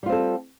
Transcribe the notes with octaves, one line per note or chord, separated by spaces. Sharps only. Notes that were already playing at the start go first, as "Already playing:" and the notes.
G3 C4 F4 A4